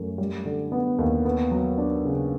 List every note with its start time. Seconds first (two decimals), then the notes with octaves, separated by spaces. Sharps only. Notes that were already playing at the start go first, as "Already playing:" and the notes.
Already playing: F#2 A3
0.18 G3
0.45 D3
0.72 B3
0.98 D#2
1.25 B3
1.51 F#3
1.78 D4
2.05 C#3